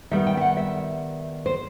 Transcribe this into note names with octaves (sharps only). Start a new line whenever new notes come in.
D#3 G3 B3 E5
G5
E5
F#5
E5
C5